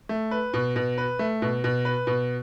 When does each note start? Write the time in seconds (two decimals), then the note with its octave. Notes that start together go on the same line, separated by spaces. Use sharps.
0.09 A3
0.31 B4
0.53 B2
0.76 B2
0.98 B4
1.19 A3
1.42 B2
1.64 B2
1.85 B4
2.07 B2